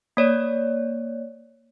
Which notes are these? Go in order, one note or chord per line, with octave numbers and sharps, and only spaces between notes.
A#3 C#5 D5